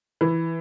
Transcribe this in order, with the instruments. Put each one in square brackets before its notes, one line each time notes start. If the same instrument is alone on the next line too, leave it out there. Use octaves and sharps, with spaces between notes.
[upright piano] E3